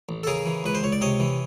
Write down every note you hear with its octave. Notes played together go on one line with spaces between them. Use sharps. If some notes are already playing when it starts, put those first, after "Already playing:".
A1
A4
C#3 G#4 A#4
E3
C#2 B4
C5
C#2 C#5
D5
C3 C#5 D#5
E3